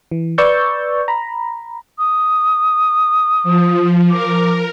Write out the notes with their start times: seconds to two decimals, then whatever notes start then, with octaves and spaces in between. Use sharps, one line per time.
0.11 E3
0.38 B4 D5 C#6 E6 G6 A6
1.08 A#5 B5
1.99 D#6
3.44 F3
4.10 A#4 D6